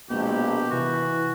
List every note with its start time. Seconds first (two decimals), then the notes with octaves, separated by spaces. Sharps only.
0.10 A#1 B2 G#3 A#3 G4
0.71 C3 E3 F#4